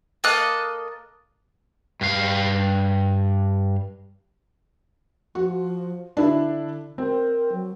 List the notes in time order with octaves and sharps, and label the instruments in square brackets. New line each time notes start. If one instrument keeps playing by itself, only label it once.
[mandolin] A#3 A4 D#5 F#6
[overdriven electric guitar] G2 F5
[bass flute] F3 [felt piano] F#4
[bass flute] D3 [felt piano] D4 E4
[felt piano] C4 [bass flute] A#4
[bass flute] F#3